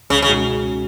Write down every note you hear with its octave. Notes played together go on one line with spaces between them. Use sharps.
C#2 C#3
C#3
B2 G#3 D#4 F#4